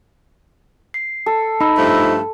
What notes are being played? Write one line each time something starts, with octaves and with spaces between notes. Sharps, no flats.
C7
A4
D#4 B5 E6
G2 F3 A3